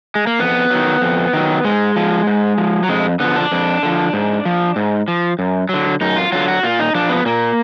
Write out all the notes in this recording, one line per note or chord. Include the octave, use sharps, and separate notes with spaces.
G#3
A#3
F2 B3
D#3 F#3
F2
D#3 F#3
G#2 G#3
F3
G#2
F3
F#3
F2 G#3
D3 F3 B3
D4
F2
D3 F3
G#2
F3
G#2
F3
F#2
D3 F#3
F#2 D#4
F4
D3 F#3 F4
F#4
A#2 F4
D#4
F3 D4
B3
A#2 A#3